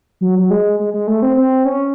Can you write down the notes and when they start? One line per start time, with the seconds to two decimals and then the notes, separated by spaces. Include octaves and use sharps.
0.21 F#3
0.39 F#3
0.51 G#3
0.80 G#3
0.94 G#3
1.07 A3
1.22 C4
1.37 C4
1.65 C#4